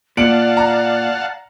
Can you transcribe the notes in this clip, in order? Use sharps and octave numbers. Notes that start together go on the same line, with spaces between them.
A#2 D5 F5 F#5 A5 C#7 D7 F#7
A#5